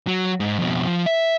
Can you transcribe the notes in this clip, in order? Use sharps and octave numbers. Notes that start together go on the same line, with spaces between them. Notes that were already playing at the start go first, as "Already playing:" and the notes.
F#3
G#2
F2 B2
F3
E5